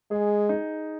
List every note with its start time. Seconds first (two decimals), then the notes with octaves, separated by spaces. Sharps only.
0.11 G#3 G#4
0.49 D#4